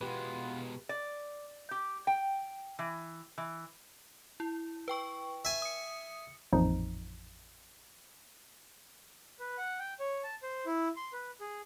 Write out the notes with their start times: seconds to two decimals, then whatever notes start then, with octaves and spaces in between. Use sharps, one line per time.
0.01 B2 G#3 B3 F4 G4 B4
0.89 D5
1.71 G4
2.07 G5
2.79 E3
3.38 E3
4.40 E4
4.88 B4 G5 C#6
5.45 E5 G#5
5.62 D#6 C#7
6.53 A1 F2 A#2 F3 D#4
9.40 B4
9.58 F#5
9.79 G5
10.00 C#5
10.23 A5
10.43 C5
10.66 E4
10.97 C6
11.13 B4
11.40 G#4